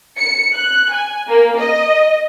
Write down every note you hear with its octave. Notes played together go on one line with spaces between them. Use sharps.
C#7
F#6
G#5
A#3
D#5